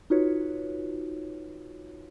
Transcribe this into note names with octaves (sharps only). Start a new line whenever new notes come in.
D#4 F4 F#4 B4 C#5